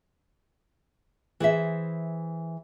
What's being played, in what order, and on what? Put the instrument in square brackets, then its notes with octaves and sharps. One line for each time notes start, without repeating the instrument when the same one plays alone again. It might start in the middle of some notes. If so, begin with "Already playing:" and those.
[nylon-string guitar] E3 G#4 C5 E5